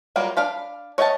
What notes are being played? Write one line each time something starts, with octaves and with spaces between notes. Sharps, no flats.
F#3 G3 A#3 F4
D4 F5 B5
C#5 D#5 E5 G5 A5